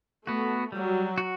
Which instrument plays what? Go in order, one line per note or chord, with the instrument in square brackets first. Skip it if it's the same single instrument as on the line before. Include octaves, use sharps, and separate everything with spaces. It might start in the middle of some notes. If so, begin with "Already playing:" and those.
[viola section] A3 [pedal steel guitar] B3 F#4
[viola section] F#3 [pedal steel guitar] G3
[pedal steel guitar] F#4